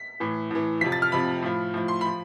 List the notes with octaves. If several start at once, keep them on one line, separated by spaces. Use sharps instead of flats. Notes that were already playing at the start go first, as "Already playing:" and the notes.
Already playing: B6
A2 E3
A2 E3
F2 C3 F3 B6
A6
F6
F2 C3 F3 B5
A2 F3
A2 F3
C6
B5
F3